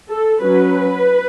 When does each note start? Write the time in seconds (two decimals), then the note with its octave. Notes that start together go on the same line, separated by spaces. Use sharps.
0.10 A4
0.42 F#3 C#4 B4